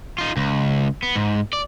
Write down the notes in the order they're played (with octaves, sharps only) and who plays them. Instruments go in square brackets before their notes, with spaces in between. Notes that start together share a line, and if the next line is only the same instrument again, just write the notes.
[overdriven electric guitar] D#4 F4
C#2
B3
G#2
D5